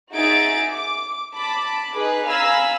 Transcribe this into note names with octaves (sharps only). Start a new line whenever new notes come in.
D#4 F#4 G#4 E5 A6 D7
D6
A5 B5 D6
D#4 G#4 B4
F5 G#5 A#5 B5 E6